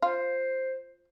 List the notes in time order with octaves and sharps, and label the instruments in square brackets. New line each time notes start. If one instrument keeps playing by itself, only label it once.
[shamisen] F4 [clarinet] C5